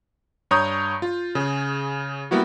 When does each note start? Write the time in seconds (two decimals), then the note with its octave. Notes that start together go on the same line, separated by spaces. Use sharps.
0.51 G2 C#5 A#5 D#6 G6
1.02 F4
1.35 C#3 G#4
2.31 G3 A#3 B3 E4 F#4